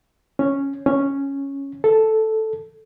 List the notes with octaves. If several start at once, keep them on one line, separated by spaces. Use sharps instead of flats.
C#4
C#4
A4